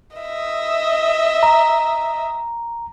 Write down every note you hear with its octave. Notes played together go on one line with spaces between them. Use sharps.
D#5 E5
A#5